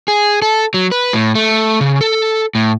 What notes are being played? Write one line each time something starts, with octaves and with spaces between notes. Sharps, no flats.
G#4
A4
F#3
B4
A2
A3
C#3
A4
A2